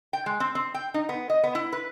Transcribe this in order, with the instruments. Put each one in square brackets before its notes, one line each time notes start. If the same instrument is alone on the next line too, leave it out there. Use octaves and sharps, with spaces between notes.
[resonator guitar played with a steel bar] G5
G#3
C4
C4
G5
D#4
B3
D#5
B3
E4
B4